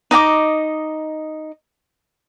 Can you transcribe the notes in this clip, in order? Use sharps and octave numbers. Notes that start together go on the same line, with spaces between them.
D#4 D#5 G5 D6